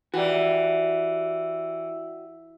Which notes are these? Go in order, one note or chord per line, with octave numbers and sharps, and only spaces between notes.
E3 F#4 G4 D5